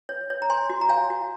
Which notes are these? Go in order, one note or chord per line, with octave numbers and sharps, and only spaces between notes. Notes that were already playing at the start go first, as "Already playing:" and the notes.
C#5
C#5
A#5
C#5 G#5 C6
F#4
A#5
C#5 F5 G#5
F#4